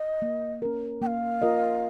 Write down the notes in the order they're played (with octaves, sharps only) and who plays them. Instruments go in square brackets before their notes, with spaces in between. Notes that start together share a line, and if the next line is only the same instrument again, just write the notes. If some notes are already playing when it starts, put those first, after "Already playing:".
Already playing: [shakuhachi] D#5
[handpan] A#3
C#4 A#4
[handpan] A#3 [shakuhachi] G5
[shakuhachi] F5
[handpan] F4 A#4 D#5